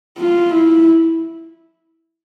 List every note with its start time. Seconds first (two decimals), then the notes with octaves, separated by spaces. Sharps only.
0.18 F4
0.51 E4